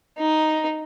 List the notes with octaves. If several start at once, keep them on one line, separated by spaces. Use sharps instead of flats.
D#4